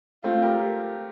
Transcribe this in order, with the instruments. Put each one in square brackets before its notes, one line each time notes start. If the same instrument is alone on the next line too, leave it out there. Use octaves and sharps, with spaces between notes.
[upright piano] A3 C4 [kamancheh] F4
[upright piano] G4 A#4